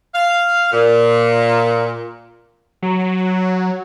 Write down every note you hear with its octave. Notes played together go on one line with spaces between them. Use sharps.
F5
A#2
F#3